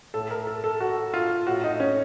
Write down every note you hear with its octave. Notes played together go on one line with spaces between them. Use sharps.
A2 A4
A#4
A4
A4
F#4
F4
A2 F#4
D#4
C#4